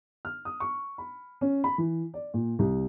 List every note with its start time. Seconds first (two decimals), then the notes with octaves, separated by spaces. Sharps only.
0.25 F6
0.45 D#6
0.60 C#6
0.98 B5
1.41 C#4
1.64 B5
1.78 E3
2.14 D5
2.34 A#2
2.59 C2